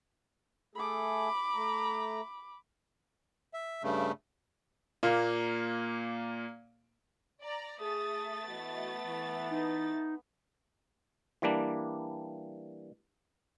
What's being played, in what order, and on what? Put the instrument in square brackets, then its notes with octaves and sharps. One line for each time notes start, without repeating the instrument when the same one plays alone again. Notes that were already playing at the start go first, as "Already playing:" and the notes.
[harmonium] A3 G#4 A4 [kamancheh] B5 D6
[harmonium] A3 A#5
[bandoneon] E5
G2 C#3 A3
[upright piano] A#2 A#3
[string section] D5 A#5
[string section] A3 A6 [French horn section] G#4 [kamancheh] D#6
[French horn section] E3 F#4 D#5 [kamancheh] B3
[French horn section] E3
[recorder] D#4
[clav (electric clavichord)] E3 G3 A#3 D4